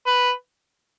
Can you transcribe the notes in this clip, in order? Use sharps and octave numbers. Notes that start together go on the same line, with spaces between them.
B4